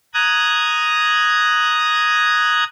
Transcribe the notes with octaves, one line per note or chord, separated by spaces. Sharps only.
A#5 D#6 F#6 G#6